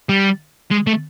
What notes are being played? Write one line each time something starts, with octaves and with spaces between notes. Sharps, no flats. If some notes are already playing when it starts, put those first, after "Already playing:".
G3
G#3
A3